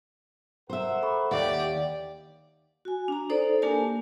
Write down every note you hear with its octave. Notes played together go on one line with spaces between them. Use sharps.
A#4 C5 E5 F#5
A4 B5 C#6
D#2 G4 D5 E5 F#5
F#4 G#5
D4 A#5
D#4 A4 C5 D5
A#3 D4 G4 A#4 G#5 A5